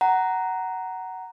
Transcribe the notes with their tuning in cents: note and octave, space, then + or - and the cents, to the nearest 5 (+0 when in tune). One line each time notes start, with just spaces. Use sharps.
F#5 +15 A#5 +0